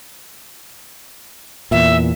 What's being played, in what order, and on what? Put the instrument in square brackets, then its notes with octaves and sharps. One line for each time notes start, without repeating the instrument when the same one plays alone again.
[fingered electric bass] E2 A#2 [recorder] E5